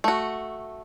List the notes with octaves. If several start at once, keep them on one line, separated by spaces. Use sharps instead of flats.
A3 F#4